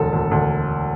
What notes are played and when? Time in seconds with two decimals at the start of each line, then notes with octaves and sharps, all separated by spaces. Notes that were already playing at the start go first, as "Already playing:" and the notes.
Already playing: E1 D2 A4
0.13 D2
0.31 D2